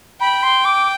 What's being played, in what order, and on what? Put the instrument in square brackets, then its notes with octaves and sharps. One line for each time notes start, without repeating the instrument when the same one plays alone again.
[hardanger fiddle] G5 [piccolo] B5
[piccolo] C6
D6